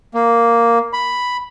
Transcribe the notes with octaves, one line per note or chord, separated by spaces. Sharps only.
A#3
B5